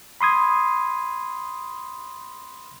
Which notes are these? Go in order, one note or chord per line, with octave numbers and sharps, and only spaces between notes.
B5 C6 D#6 G#6